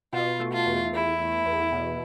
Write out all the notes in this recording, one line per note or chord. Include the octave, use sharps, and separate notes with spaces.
B2 F4
A3
F4
E2
E2 E4
A3
E2
B2